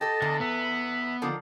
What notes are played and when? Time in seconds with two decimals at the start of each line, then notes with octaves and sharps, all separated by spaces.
0.01 G4 A4 D#5 A5
0.22 E2 D3
0.41 B3 E5
1.22 D3 D#3 F3